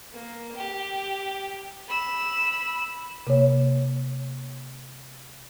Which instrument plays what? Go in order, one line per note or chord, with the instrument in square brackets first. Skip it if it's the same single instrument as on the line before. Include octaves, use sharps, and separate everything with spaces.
[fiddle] A#3
G4
B5 E6
[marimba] C3 A#3 C#5